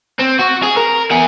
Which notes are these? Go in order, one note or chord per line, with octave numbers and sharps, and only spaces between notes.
C4
F#4
G#4
A#4
B3 G#4